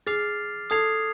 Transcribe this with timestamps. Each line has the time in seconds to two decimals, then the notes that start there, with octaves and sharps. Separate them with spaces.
0.06 G#4 D6 F6 A6 C7 F7
0.70 A4 D#6 G#6 C7 F7